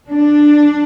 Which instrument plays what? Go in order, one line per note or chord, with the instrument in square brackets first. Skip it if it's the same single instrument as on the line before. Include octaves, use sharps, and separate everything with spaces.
[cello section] D4